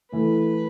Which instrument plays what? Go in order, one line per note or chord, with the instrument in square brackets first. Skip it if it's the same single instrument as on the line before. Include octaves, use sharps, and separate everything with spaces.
[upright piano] A2 E3 A3 [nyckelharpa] B4